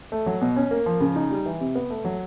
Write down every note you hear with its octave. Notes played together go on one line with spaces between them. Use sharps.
A3
F#3
B2
C#4
A#3
F3
C#3
D#4
G3
E3
C3
B3
A3
F#3